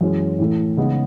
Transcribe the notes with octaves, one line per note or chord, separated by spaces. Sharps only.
F#2 E3 G#3 C#4
A2 E3 A3
C#3 G#3 B3 D#4